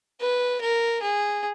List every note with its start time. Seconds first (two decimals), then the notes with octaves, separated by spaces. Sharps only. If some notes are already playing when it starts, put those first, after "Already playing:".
0.20 B4
0.61 A#4
1.02 G#4